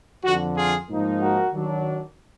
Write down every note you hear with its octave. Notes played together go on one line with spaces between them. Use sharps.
F2 D3 F3 F#4
F4 G#4
G#2 F3 A#3 D#4
F#4 A#4
D#3 F#3 D4